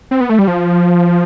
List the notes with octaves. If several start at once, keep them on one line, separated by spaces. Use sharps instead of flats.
C4
B3
A3
G3
F3